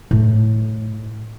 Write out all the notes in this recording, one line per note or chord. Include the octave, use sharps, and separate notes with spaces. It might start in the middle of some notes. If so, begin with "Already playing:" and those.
A2